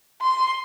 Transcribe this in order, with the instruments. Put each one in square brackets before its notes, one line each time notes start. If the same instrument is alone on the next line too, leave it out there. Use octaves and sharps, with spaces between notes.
[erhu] C6